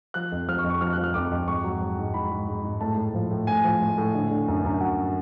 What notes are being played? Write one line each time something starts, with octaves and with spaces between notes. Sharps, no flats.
F3 F#6
F2
F3 F6
C#6
F2
C#6
F3 F6
F3 F#6
F6
F2 D6
F2
G#2 C#6
F#3
F#3
G#2
G#2 B5
G#2
G#2
G#2
A2 A5
A2
F3
A2
A2 G#5
F3
A2
A2
D3
D3
F#2
F#2
F#3 F#5